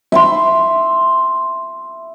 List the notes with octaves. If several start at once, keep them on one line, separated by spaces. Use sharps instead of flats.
E5 B5 C6